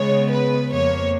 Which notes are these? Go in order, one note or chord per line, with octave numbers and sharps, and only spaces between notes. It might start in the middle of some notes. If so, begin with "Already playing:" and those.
Already playing: C#3 G#3 B3 C#5
B4
F2 F3 A#3 C#5